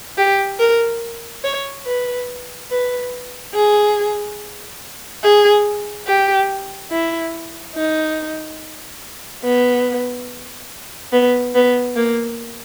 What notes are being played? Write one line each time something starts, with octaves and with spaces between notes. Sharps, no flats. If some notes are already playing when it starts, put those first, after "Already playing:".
G4
A#4
C#5
B4
B4
G#4
G#4
G4
E4
D#4
B3
B3
B3
A#3